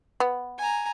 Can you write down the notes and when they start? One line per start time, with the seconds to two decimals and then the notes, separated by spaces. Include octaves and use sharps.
0.20 B3
0.58 G#5 A#5